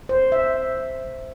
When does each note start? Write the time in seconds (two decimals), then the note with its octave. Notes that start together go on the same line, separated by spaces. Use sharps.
0.09 C5
0.32 E5